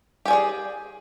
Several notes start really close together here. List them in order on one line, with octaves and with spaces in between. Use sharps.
G4 G#5 D5 G#4